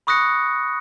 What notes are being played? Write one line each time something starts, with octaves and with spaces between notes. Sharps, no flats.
B5 C#6 D#6 F#6 A#6 C#7